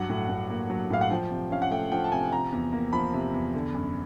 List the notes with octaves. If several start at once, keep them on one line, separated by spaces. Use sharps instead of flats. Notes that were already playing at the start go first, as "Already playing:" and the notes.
Already playing: G2 F#3 F#5
A2
A2
A#3
F#3
A2 F5
F#5
F3 G5
C3
C#4 F5
F#5
A3 G5
F3 G5
A5
C3 G#5
C3 A#5
E2
A#3
F3 B5
C3
E2
D3
F#2